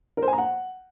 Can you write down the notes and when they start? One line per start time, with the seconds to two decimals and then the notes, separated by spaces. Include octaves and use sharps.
0.17 A#4
0.22 C5
0.28 G#5
0.33 A#5
0.38 F#5